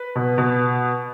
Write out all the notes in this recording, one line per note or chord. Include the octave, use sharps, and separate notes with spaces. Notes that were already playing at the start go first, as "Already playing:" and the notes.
Already playing: B4
B2
B2